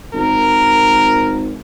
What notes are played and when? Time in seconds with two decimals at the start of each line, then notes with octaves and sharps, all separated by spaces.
0.14 G#1 A#4